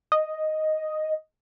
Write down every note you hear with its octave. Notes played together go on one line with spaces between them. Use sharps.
D#5